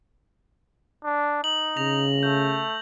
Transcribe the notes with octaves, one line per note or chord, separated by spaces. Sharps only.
D4
D#4 F#7
C#3 A#6 F7
A3 G6